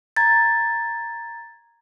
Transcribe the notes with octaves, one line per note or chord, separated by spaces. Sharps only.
A#5 G#6 A6